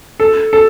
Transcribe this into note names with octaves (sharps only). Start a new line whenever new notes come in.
A4
A4